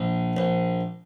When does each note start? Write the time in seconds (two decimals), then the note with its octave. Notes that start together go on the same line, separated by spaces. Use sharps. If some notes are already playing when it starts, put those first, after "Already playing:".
Already playing: A#1
0.37 A#1